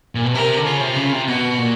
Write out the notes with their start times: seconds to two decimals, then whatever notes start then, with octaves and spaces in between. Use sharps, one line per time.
0.15 A#2
0.24 B2
0.34 C3 A#4
0.57 D3
0.65 C#3 F4
0.81 C3
0.96 C#3
1.12 C3
1.27 B2 F#4
1.59 A#2